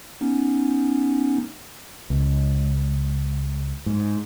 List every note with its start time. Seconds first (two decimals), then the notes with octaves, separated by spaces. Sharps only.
0.21 B3 C#4 D#4
2.10 C#2
3.86 G#2